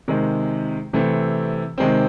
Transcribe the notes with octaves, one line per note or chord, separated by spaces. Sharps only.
C3 D#3 G#3
C3 E3 A3 C4
C3 D#3 G#3 C4